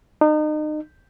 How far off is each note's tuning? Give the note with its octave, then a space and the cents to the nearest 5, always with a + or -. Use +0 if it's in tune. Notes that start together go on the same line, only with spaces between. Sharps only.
D#4 -35